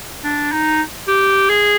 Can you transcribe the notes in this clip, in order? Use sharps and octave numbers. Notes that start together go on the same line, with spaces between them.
D4
D#4
G4
G#4